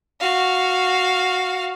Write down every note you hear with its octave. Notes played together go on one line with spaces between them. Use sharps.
F#4 F5